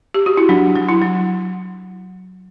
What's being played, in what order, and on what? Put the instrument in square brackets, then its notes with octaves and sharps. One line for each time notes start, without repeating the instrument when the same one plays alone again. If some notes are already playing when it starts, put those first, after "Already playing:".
[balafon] G4
F#4
E4
[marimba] F#3 [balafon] D4
[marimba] F#3
[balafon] E4
[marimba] F#3